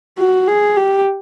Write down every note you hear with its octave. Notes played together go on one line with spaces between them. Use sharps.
F#4
G#4
G4